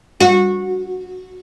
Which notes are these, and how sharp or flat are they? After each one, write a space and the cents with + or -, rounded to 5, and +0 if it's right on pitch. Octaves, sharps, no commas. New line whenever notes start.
F#4 -20